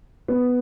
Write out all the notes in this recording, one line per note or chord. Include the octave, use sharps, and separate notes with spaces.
B3